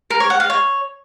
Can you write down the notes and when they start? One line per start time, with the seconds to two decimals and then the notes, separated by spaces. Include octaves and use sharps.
0.10 A#4
0.20 C#5
0.30 F#5
0.40 F5
0.50 C#5